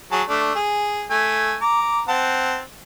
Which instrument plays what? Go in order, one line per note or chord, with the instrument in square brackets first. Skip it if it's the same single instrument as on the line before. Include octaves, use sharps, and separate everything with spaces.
[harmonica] F#3 G#4 A5
A3 D4
G#4
A3 G#5
A#5 D6
C4 F#5 A5